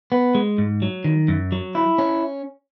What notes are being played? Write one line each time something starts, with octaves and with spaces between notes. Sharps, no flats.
B3
G#3
G#2
F#3
D#3
F#2
F#3
E4
C#4